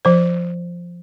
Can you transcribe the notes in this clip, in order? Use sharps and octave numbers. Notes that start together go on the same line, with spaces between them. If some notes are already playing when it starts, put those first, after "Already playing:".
F3 C5